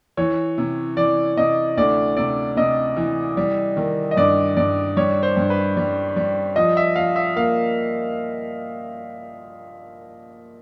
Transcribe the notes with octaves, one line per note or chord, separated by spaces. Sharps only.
E3 C#5
C3
E3 D5
C3 D#5
D2 D5
C3 D5
C3 D#5
E3
G3
D#3
D#5
G2 D5
G2 D5
G3 C#5
C5
G2
B4
G3
G3
F3 D#5
E5
F3 F5
E5
A#3 F5